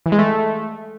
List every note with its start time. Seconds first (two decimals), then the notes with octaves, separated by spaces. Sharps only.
0.06 E3
0.12 G#3
0.19 A3